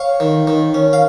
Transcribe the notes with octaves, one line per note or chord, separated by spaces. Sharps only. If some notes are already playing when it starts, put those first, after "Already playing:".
Already playing: C#5 F5
D#3
D#3
C#4
F5